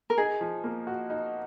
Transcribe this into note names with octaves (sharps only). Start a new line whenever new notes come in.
A#4
D#4 G#4
F3
A#3
F#4
D#4